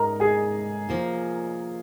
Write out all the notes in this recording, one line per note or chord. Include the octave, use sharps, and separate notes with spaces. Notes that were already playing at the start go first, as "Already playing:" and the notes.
Already playing: G#2 G#3 D#4 A#4 A#5
G#4 G#5
F3 A#3 F4